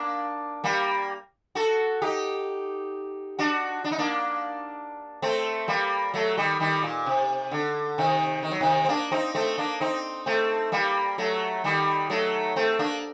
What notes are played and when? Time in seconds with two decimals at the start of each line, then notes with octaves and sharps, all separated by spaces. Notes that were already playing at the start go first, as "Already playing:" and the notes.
Already playing: A#3 D4
0.64 G3 A#3
1.55 F#4 A4
2.02 D#4 G4
3.39 D4 F#4
3.84 D4
3.91 D#4
3.98 A#3 D4
5.22 A3 C4
5.68 G3 A#3
6.14 F#3 A3
6.37 D#3 G3
6.60 D#3 G3
6.83 A#2
7.06 C3
7.51 D3
7.98 C3 D#3
8.43 D#3
8.51 F#3
8.61 C3 D#3
8.85 C4
8.89 A#3 D4
9.11 C4 D#4
9.35 A3 C4
9.58 A#3 D4
9.81 C4 D#4
10.26 A3 C4
10.72 G3 A#3
11.18 F#3 A3
11.64 D#3 G3
12.10 F#3 A3
12.56 A3 C4
12.79 A#3 D4